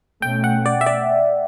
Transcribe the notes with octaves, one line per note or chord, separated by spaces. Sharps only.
B2 A3 C#4 G5
F#5
D5
E5
D5